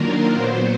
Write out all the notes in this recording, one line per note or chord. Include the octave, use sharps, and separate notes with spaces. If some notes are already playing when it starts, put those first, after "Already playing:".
Already playing: D#3 F#3 A#3 D4 F4 A#4
A#2 F#3 B3 C5